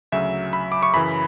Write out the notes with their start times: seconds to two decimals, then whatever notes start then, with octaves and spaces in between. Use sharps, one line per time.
0.12 D2 C#3 F#3 E5
0.53 B5
0.72 D6
0.83 C#6
0.94 F#2 C#3 E3 B5